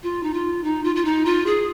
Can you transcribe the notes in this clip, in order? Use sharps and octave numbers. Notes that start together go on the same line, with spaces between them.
F4
D#4
F4
D#4
F4
F4
D#4
F4
G#4